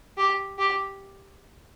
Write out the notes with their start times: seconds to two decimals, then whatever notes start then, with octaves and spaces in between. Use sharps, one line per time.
0.17 G4
0.58 G4